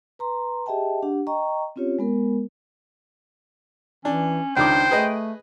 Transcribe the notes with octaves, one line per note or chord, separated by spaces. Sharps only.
B4 A#5 C6
G4 G#4 D#5 E5 G5 A5
D4 G4 F#5
D#5 G5 A#5 C#6
C4 C#4 F4 G4 C#5
G#3 B3 A#4
E3 C#4 D4
C#2 D#3 D4 C5 G5 D6
A3 G#4 B4 D#5